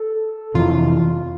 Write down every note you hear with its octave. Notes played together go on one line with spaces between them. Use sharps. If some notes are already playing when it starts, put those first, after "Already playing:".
Already playing: A4
F2 C3 E3 F4